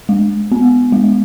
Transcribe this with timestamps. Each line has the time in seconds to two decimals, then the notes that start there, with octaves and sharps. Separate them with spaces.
0.09 G#3
0.52 B3
0.92 G#3